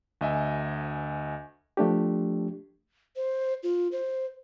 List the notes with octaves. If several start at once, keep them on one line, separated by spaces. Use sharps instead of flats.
D2 D#5 E5 G#5
F3 A3 D4 G4
C5
F4
C5